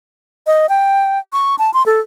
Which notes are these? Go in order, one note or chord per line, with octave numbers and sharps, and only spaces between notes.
D#5
G5
C#6
A5
C6
A4